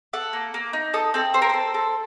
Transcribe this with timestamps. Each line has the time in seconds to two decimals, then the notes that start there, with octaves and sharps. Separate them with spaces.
0.13 A4 F#5
0.33 A#3
0.54 A#3
0.73 D#4
0.94 A4 D#5
1.14 C4 A4
1.34 A4 C5
1.42 A#4
1.49 A4 C5
1.74 A4